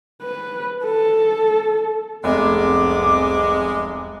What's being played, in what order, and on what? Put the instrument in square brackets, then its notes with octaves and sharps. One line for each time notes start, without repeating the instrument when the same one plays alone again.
[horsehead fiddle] B4
A4
[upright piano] F1 [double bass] C2 F2 [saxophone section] G#3 [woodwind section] B3 D6